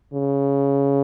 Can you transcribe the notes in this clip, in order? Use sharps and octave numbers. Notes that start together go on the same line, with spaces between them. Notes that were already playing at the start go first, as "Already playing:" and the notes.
C#3